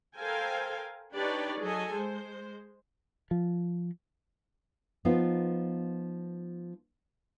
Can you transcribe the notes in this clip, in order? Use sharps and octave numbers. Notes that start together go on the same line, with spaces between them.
A4 A#4 C5 F5 G5 G#5
D4 D#4 G4 B4 C#5 D5
F#3 G#4 A4 D#5 G#5
G#3 C5
F3
F3 B3 D#4 F4